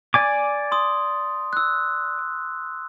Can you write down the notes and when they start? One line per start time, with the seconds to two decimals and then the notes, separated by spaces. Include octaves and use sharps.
0.14 D5 G#5 D6
0.72 C6 D#6
1.53 E6 F#6